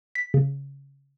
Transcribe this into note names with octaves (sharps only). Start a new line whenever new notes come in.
B6
C#3